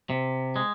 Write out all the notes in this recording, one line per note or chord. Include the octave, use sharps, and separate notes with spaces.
C3
G#3